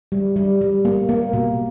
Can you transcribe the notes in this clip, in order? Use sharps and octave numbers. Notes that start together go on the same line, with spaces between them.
G3
G3
G3
A#3
A#3
B2